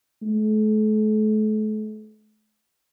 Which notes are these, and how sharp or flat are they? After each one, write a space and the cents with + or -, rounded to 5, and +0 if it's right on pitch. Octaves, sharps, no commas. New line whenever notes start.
A3 -40